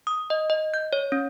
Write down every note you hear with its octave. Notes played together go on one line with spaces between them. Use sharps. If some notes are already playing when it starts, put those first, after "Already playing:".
D#6
D#5
D#5
G6
C#5
C#4